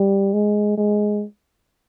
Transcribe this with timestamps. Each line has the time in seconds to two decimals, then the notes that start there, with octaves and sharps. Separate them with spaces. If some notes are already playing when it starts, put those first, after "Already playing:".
Already playing: G3
0.33 G#3
0.78 G#3